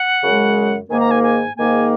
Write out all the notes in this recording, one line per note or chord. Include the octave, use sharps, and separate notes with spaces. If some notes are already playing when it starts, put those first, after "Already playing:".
Already playing: F#5
F#2 C#3 G#3
G#2 D#3 A#3 G#5
A#5
G#5
G#5
G#2 D#3 A#3 G#5